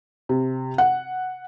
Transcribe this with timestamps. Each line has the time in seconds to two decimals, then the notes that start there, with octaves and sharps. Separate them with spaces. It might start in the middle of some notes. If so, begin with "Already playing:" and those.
0.29 C3
0.78 F#5